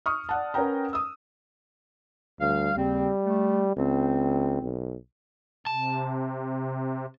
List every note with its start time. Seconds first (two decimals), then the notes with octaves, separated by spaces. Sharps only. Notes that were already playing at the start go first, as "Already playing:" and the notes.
0.06 C#6 D#6 F6
0.29 D5 F#5 A5
0.54 C#4 A#4 B4 F#5 G5 A#5
0.93 D#6 E6
2.40 D2 G3 F5
2.76 D#2 C#3 G3 C4
3.25 A3
3.76 C#2 C4
4.62 B1
5.67 C3 A5